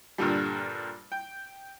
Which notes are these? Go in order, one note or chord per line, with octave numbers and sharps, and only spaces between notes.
G2 A#2 D3 G3
G5